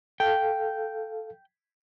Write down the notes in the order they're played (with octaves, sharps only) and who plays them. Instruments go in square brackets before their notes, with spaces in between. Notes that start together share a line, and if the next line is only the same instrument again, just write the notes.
[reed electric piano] A4 F5 [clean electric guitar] G5